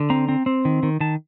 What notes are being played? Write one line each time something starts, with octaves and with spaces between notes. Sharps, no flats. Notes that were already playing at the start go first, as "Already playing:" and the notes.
Already playing: D3
C4 A#5
C4
C4
D#3
D#3
D#3 A5